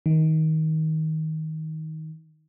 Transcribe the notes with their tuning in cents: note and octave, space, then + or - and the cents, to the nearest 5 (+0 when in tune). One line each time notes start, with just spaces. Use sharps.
D#3 +20